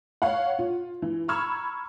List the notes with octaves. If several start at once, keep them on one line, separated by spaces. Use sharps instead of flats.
C#5 F5 F#5
F4
E3
A#5 B5 C#6 E6 F6 G#6